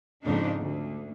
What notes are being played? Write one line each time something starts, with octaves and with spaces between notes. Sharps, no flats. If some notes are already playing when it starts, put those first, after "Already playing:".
F2 G#2 C#3 A#3 D4 D#4
D2